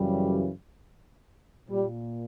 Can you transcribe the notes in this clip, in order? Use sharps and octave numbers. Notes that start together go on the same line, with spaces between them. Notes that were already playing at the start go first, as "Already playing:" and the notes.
Already playing: F#2 C#3 E3 G3
A#2 G3